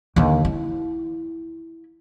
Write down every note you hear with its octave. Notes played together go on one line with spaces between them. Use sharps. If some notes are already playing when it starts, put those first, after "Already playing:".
D#2 D3
E4